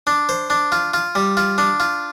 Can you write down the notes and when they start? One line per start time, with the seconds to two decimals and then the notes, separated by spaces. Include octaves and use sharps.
0.07 D4
0.29 C5
0.50 D4
0.72 F4
0.94 F4
1.15 G3
1.37 F4
1.58 D4
1.80 F4